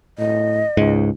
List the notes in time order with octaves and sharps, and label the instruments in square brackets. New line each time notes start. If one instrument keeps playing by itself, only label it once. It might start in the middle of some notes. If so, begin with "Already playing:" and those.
[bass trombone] A2 [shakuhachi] D#5
[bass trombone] C#2 [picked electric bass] G#2